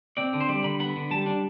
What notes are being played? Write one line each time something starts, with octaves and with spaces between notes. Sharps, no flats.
C4 D5
D3
C5
G3 D5
D3 B5
B3 B5
D3
G3 A5
D4